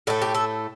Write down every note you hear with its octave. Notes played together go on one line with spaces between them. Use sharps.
A2 A3 A4
G4
A4